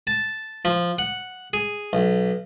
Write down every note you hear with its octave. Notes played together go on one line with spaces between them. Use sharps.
A5
F3
F#5
G#4
B1